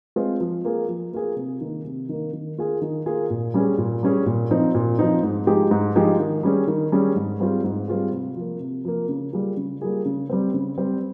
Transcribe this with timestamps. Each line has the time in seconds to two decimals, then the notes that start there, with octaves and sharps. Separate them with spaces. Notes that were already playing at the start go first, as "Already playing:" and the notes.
0.16 G#3 C4 F4
0.41 F3
0.65 A#3 F4 G#4
0.89 F3
1.13 A#3 F4 G#4
1.36 C3
1.61 D#3 A#3
1.84 C3
2.09 D#3 A#3
2.33 D#3
2.58 A#3 F4 G#4
2.82 D#3
3.06 A#3 F4 G#4
3.30 A#2
3.54 G3 C#4 G#4
3.78 A#2
4.03 G3 C#4 G#4
4.26 A#2
4.51 F3 C4 D#4
4.75 A#2
4.99 F3 C4 D#4
5.23 G#2
5.47 F3 G#3 D#4 G4
5.71 G#2
5.95 F3 G#3 D#4 G4
6.20 D#3
6.43 G3 C#4 G#4
6.68 D#3
6.92 G3 C#4 G#4
7.16 G#2
7.40 G3 C4 F4 G#4
7.64 G#2
7.88 G3 C4 F4 G#4
8.12 C3
8.37 F3 A#3
8.60 C3
8.85 F3 A#3
9.09 C#3
9.33 G3 A#3 F4 G#4
9.57 C#3
9.81 G3 A#3 F4 G#4
10.05 C#3
10.30 G3 C4
10.54 C#3
10.78 G3 C4